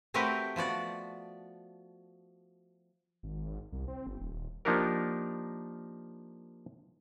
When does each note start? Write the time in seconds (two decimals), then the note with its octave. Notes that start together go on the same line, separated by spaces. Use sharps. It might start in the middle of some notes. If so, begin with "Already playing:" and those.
0.14 A3 C4 F#4 G4 A#4 B4
0.56 F3 B3 F#4 D5
3.23 G#1
3.72 C2
3.88 C4
4.07 G1
4.20 D#1
4.65 F3 A#3 D4 D#4 G4 A#4